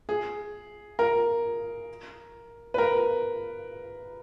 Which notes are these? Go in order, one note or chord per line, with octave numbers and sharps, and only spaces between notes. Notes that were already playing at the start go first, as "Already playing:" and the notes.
G#4
A#4
B4
A#4